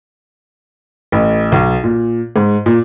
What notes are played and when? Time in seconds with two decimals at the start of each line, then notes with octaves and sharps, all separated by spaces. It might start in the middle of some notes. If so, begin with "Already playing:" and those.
1.12 A1
1.52 B1
1.84 A#2
2.36 G#2
2.66 A#2